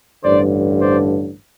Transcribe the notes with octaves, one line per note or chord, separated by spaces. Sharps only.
A1 G2 D3 C5 D5
C5 D5